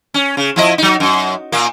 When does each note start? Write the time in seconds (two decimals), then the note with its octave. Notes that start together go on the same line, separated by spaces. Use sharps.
0.14 C#4
0.37 C#3
0.56 F3 E4 D#5
0.78 F#3 D#4
1.00 F#2
1.52 A#2 A#3